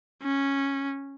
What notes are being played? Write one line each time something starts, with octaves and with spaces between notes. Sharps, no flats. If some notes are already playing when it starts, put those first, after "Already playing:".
C#4